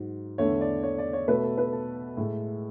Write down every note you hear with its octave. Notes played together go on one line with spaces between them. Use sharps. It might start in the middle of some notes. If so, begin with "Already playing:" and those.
Already playing: G#2 F#3
E2 D3 A3 C#5
D5
C#5
D5
C#5
B2 A3 B4
A4
B4
A4
A2 G#3